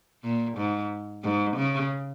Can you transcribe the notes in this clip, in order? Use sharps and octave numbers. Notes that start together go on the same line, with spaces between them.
A#2
G#2
G#2
C#3